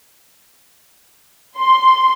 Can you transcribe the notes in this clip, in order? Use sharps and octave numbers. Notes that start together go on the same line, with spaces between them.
C6